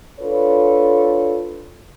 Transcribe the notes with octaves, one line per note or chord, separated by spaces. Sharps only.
D4 F4 A4 B4 C#5